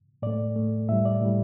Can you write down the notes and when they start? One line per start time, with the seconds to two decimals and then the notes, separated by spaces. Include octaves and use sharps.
0.22 A2 A3 D5
0.56 A2 A3
0.89 A2 G3 E5
1.05 D5
1.22 A2 G3